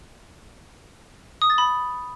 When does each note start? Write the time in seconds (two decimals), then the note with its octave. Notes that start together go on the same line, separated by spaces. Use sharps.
1.42 D#6
1.50 A6
1.58 B5